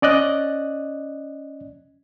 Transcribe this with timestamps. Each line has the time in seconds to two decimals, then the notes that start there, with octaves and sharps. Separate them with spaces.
0.02 C#4 D5 D#5 F#6